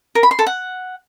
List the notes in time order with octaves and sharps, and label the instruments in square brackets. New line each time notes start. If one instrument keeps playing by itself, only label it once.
[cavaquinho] A#4
B5
C6
A4
F#5